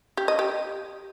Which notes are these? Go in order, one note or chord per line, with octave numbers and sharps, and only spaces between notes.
G4
D#5
G4